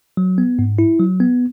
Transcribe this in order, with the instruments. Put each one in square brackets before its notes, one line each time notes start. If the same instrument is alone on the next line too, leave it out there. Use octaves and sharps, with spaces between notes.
[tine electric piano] F#3
B3
G#2
E4
F#3
B3